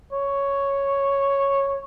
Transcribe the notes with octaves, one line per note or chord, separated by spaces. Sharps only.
C#5